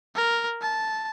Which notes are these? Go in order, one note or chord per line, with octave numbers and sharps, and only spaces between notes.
A#4
A5